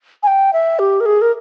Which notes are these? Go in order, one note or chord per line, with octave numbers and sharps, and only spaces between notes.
G#5
G5
E5
G4
A#4
G#4
A#4